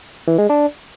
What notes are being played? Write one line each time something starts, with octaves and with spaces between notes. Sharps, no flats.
E3
G#3
D4